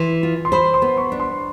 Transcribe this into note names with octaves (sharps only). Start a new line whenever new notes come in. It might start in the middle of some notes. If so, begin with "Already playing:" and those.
Already playing: E3 C6
F4
C6
C5 B5
C6
B3
C#6
D4
C6